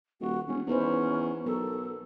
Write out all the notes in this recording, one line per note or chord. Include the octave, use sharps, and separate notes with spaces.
D#1 F#4
E1 C#4
E2 C#4 D#4 B4 C5
B1 A4 A#4